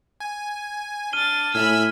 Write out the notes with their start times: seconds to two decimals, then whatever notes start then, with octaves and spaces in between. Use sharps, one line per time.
0.20 G#5
1.13 D4 F6 A6 D#7 G7
1.55 A2 E5 G#5 B5 E6 F6